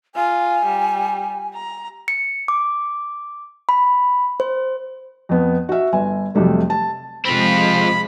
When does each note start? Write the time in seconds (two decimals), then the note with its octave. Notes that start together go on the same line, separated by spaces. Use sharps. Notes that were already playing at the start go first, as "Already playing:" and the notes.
0.15 F4 G#5
0.65 G3
1.54 A#5
2.08 C#7
2.48 D6
3.69 B5
4.40 C5
5.29 F2 B3
5.69 F#4 E5
5.93 G1 G#5
6.35 F2 C3 F#3 G3 A3
6.70 A5
7.25 C3 F3 G#3 C4 F4 B5